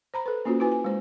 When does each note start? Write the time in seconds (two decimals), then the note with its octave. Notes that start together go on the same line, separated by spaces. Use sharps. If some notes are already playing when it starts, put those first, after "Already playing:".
0.14 C5 A#5 B5
0.26 A4 B4
0.45 A#3 C#4 F4 F#4 C5
0.60 E4 F#4 B4 G#5
0.71 G#5
0.84 G#3 C5